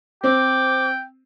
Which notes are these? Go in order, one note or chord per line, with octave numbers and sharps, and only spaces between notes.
C4 G5 D6